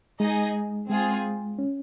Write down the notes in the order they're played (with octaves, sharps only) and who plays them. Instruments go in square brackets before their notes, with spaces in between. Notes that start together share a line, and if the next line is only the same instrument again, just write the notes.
[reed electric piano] G#3 [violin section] D#4 G#4 D#5
[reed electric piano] G#3 [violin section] C4 F4 G#4
[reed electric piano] C#4